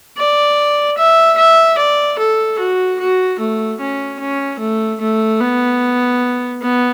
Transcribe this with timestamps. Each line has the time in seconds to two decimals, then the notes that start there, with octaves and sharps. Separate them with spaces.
0.17 D5
0.98 E5
1.37 E5
1.78 D5
2.19 A4
2.59 F#4
2.99 F#4
3.39 A3
3.80 C#4
4.19 C#4
4.60 A3
5.01 A3
5.40 B3
6.62 B3